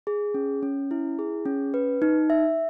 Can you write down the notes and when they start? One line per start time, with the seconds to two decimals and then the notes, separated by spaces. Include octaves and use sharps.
0.07 G#4
0.34 C#4
0.63 C#4
0.91 E4
1.19 G#4
1.46 C#4
1.74 B4
2.02 D#4
2.30 E5